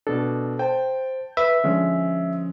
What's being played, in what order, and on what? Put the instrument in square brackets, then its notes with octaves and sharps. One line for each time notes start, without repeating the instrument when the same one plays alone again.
[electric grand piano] B2 D4 [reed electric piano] A4
[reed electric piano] C5 [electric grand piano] G5 A5
[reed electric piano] B4 [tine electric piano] E5
[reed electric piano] D3 F3 C#4 [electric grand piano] G#3